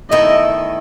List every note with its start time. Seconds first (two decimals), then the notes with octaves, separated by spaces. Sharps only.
0.11 E2 D#3 A3 E4 A4 D#5